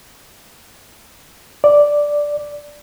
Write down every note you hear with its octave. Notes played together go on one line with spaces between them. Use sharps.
D5